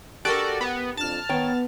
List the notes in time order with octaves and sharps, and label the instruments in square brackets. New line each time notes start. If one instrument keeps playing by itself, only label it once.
[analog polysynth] F#4 A4 D5 [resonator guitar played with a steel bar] G4 A#4
[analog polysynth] B3
[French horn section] F2 D4 [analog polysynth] A5 F6
[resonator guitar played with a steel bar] D#3 C#5 G5 [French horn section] B3